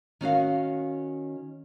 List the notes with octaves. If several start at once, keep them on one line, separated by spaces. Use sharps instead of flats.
D#3 C#4 F#4 F5